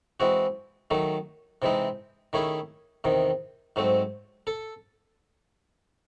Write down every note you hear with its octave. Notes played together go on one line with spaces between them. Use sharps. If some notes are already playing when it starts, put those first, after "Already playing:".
E3 G#3 C4 F#4
D#3 F#3 A3
C3 E3 G#3 C4 D#4
D#3 A3 C#4 E4 G#4
E2 C3 D#3
G#2 F#3 A3 C4
A4